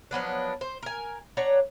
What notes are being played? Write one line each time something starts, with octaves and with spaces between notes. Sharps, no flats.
F3 F#3 B3 D4
C5
A#4 G#5
D4 C#5 F#5 A#5